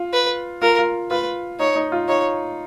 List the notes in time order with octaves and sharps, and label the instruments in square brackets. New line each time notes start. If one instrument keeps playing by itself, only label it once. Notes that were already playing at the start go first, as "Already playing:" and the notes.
Already playing: [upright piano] F4
[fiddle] B4
[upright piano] F4 [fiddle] A#4
[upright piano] F4
[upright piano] F4 [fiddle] B4
[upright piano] D#4 [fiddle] C#5
[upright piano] D#4
F4
[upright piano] D#4 [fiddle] C#5